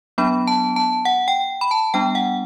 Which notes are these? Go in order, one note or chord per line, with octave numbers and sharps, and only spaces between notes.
F#3 B3 D4 B5
A5
A5
F#5
G5
B5
A5
G3 B3 D4 G5
F#5